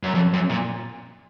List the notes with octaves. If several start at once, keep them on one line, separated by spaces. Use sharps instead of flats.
F#2
F2
F#2
A#2